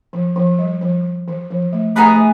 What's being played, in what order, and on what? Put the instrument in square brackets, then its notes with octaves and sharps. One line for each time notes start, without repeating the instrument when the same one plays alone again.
[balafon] F3
F3
G3
F3
E3
F3
A3
[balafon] A3 [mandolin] B3 D#4 G#4 B4
[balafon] A3